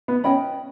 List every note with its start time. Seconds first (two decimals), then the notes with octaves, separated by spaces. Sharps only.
0.08 B3
0.24 C#4 D#5 G5 B5